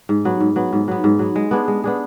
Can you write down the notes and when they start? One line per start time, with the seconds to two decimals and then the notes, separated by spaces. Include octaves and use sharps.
0.09 G#2
0.25 F#3 B3
0.40 G#2
0.56 F#3 B3
0.73 G#2
0.88 F#3 B3
1.04 G#2
1.19 F#3 B3
1.36 G#3
1.51 B3 D4 G#4
1.68 G#3
1.84 B3 D4 G#4